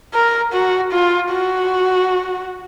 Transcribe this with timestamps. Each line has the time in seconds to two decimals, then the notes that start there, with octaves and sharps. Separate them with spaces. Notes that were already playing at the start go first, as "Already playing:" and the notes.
0.14 A#4
0.53 F#4
0.92 F4
1.31 F#4